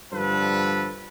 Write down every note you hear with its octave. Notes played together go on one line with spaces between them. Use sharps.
G2 D3 F3 A4 B4